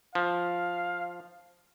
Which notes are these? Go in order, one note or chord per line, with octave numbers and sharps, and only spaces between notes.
F3 F5